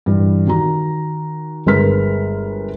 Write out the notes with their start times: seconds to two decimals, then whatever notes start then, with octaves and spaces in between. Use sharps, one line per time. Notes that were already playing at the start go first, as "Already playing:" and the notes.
0.06 G2 E3
0.47 D#3 F#4 A#5
1.66 G1 G#3 A#4 B4 F6 B6